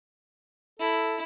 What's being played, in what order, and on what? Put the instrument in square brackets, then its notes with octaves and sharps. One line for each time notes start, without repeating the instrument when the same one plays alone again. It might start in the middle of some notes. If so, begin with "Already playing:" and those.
[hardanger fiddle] E4 [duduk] A4